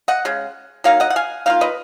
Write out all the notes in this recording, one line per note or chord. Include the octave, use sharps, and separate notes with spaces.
D#5 F#5
C#3 G#3
F#3 A#3 D#4 F5
D#5 F#5
F#5
F5 G#5
D#3 A#3 F4 F5
B4 D#5